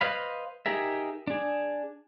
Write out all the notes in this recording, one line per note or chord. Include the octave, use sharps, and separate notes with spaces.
B4 C5 D#5 F5 B5
D#4 G4 G#4 A#4 E5
D4 G#4